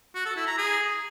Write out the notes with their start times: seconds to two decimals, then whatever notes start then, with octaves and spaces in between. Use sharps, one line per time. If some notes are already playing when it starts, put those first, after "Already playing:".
0.15 F#4
0.25 A4
0.36 E4
0.47 A#5
0.58 G#4